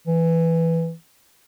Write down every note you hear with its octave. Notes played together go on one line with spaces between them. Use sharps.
E3